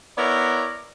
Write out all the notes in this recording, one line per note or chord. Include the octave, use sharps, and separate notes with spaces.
B3 E4 A#4 C#5 D5